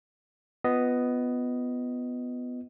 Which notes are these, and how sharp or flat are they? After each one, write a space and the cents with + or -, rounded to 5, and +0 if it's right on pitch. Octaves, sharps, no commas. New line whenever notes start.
B3 +10 F4 +0 D#5 +0